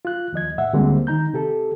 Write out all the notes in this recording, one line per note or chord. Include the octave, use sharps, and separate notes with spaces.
F4 F#6
D#2 F3 D#5 G#6
C2 A2 E5 F#5
D2 D3 G3 G#3 A#3 C4
D#3 D#4 A#5 G6
C3 G4 A4